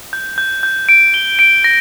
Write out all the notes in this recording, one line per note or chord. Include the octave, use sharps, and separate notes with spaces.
G6
G6
G6
D7
G7
D7
A#6